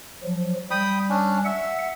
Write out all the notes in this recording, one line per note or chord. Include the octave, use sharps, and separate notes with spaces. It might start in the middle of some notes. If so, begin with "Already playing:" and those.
F3 F#3
G3 G5 B5 D#6
C#4 D4
E5 F#5